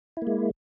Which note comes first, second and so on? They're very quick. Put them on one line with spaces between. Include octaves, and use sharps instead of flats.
E4 A#3 G#3